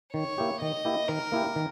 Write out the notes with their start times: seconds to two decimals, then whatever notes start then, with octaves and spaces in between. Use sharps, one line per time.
0.13 D#3 C#5
0.38 A#3 E4 G4
0.61 D#3 D#5
0.85 A#3 E4 G4
1.08 D#3 A#4
1.32 A#3 E4 G4
1.56 D#3